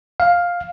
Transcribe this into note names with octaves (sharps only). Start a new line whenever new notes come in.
F5